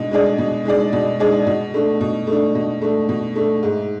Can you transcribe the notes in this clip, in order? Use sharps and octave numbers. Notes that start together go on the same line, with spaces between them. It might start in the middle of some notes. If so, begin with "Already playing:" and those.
Already playing: B2 G#3 D4
G#3 D4 G#4 D5
B2
G#3 D4 G#4 D5
B2
G#3 D4 G#4 D5
B2
A3 D4
B2
A3
D4
B2
A3 D4
B2
A3 D4
G#2